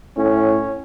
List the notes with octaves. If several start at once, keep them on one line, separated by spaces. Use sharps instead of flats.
A2 C#4